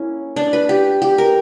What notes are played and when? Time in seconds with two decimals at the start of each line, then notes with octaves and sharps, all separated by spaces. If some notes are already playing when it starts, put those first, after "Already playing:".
Already playing: A#3 C#4 E4
0.36 D4
0.53 B4
0.69 G4
1.02 G4
1.18 A#4